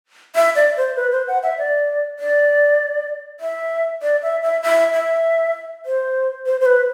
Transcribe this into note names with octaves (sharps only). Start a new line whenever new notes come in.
E5
D5
C5
B4
C5
F#5
E5
D5
D5
E5
D5
E5
E5
E5
E5
C5
C5
C5
B4